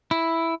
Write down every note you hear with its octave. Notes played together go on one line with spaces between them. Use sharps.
E4